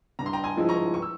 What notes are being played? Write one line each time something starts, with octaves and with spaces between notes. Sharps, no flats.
G2 A#5
C6
G5 A#5
G#5 C6
F3 G#3 E4
A#5 C#6
C#6
E6